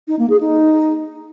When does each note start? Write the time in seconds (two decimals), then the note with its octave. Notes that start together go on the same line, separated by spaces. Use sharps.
0.08 D#4
0.19 A#3
0.30 G#4
0.41 D#4